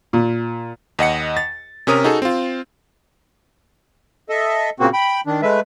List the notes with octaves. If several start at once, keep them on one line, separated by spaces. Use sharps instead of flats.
A#2
D#2 D#5 F#5 C#7
A6
C3 C#4 A#4 D#6
D#4 F#4 G#4 A4
C4 F4
A4 D#5 E5
A#2 C#3 A#3 C4 F#4
G5 B5
D#3 D4
G#3 A3 B4 E5